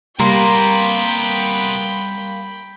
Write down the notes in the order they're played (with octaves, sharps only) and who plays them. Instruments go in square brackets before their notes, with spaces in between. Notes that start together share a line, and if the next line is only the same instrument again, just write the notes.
[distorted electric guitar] C3 B3 [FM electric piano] G3 C6 [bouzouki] A#3 [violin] G5 B5